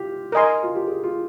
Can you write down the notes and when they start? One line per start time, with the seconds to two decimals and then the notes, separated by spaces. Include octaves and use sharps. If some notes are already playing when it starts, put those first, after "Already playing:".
Already playing: F4 G4
0.32 A#4 D#5 G#5 C6
0.63 F4
0.75 G4
0.88 G#4
1.03 F4